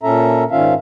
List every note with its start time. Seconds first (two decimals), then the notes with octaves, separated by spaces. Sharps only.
0.03 A#2 C#4 A4 E5 A#5
0.51 G#2 D#3 C#4 F4 E5 F5